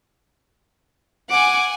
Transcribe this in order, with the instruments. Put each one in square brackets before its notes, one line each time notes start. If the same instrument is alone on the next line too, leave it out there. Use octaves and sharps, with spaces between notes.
[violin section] F#5 G#5 [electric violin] D6